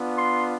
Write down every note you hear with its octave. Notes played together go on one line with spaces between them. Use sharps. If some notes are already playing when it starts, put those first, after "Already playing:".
Already playing: B3 D4 F4
C6